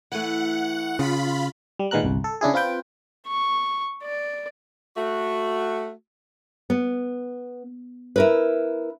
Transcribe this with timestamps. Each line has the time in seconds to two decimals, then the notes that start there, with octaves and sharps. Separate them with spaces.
0.12 E3 A3 F#5
0.99 C#3 F4 B5
1.79 G3
1.91 A#2 D#3 G#3 B3 A#4 F#6
2.03 G1 C2
2.24 A4
2.41 C#3 D4 E4 G#4
2.54 C4 F4 B4 G5
3.27 C#6
4.04 D5
4.97 A3 F#4
6.70 B3
8.16 E4 A#4 B4